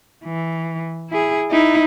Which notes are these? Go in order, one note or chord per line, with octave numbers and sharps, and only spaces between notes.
E3
E4 G#4
D#4 E4